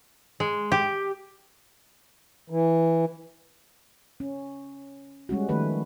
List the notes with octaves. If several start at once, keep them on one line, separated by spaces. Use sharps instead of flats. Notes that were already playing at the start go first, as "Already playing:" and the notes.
G#3
G4
E3
C#4
G3 G#3 C#4 F#4
D#3 F3 A3 B4